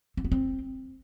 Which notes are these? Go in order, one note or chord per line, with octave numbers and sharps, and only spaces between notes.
C4
B3
C4